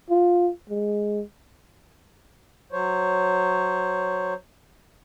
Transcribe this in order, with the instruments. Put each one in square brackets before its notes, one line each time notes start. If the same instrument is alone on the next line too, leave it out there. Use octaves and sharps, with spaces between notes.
[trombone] F4
G#3
[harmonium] F#3 C5 C#5